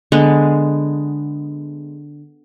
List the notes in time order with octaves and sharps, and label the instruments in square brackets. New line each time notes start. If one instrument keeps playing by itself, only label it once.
[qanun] D3 G#3 B3